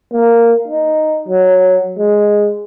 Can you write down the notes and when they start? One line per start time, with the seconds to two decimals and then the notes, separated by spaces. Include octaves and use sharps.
0.12 A#3
0.68 D#4
1.28 F#3
1.97 G#3